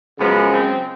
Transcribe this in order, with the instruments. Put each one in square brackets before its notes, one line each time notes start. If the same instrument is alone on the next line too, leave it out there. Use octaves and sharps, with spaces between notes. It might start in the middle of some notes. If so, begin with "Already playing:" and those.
[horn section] F#2 C#3 F3 G#3 B3
C4